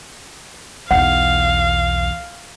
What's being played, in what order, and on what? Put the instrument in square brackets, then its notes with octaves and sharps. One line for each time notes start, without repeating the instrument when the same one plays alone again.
[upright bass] B1 E2 [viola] F5 [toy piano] F#5